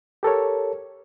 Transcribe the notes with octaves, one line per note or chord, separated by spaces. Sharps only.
G4 A4 A#4 C#5